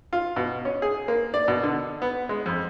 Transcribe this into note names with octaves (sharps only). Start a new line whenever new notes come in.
F4
B2
C#4
G#4
A#3
D5
B2
D3
B3
G#3
F2